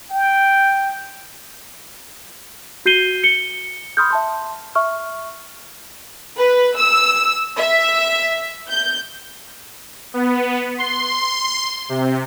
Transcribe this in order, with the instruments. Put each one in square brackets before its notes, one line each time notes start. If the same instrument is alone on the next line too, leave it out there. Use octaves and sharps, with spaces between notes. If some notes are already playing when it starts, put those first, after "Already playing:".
[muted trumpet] G5
[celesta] F#4 G6 C7 D#7 G7
C#7 G7
B5 C6 D#6 F6 G6
E5 A5 C6
E5 C#6 F6
[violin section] B4
E6
E5
G6
[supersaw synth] B3
C6
C3